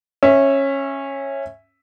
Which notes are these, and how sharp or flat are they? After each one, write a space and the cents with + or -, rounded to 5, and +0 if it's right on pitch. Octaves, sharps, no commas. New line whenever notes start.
C#4 -15 E5 +0